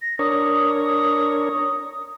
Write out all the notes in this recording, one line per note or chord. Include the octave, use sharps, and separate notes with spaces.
A#6
D4 A#4 C#5 D#6